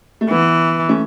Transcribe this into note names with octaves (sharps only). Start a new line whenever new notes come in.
A3
E3 B3
A3 C#4